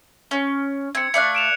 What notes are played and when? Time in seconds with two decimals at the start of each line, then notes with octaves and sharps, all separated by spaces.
0.31 C#4
0.95 C4 G#6 C#7
1.14 A3 D5 F5 F#6 C#7
1.35 D7 E7 F7